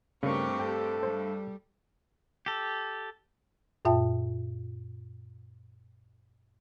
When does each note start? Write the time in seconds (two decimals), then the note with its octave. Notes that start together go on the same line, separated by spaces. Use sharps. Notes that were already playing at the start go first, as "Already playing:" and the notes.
0.23 G2 C#3 A3 C4 G4 A#4 C#6
0.60 A4 G5
1.03 G3 C5
2.46 G4 A4
3.85 F#2 A#2 F4 E5 G5 A5